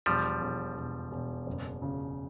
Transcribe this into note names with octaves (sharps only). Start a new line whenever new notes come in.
E1 F3 G3
E1
E1
E1
F#1
C#3